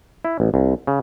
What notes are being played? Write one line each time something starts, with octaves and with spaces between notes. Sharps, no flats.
E4
A1
C2
C#3